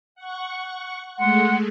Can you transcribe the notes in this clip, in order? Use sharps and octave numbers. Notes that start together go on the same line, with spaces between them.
F#5 C#6
G#3 A3 F#5 C6